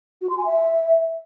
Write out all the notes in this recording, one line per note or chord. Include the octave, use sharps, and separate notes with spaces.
F#4
C6
G#5
E5